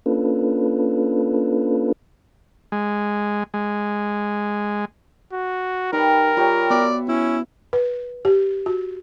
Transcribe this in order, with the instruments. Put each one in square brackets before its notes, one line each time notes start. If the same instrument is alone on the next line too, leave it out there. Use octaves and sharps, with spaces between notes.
[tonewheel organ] A#3 C#4 D4 F4 A4 B4
[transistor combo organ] G#3
G#3
[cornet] F#4
[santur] G3 B4 F#5 [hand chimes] D#4 [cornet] A#4
[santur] G3 G4 C#5 [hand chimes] F4 A#5 C#6
[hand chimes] B3 [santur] F#4 E5 [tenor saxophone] D5
[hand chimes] B3 [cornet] C#4 [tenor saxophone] E4
[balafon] B4
G4
F#4